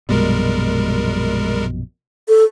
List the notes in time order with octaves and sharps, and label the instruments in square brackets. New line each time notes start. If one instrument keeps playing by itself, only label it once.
[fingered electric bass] A#1 F#2 B2 [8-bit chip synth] G3 G#3 A#4
[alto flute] A4